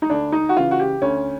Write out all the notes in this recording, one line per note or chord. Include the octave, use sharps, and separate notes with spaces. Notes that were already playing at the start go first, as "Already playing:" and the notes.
D#4
D2 D4
D#4
F#4
C#3 E3 F4
F#4
G4
D2 C#4